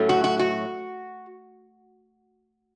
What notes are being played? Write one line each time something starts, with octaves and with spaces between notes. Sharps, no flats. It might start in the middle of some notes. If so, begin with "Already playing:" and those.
Already playing: A2 F#3 A3 C#4
F#4
F#4
F#4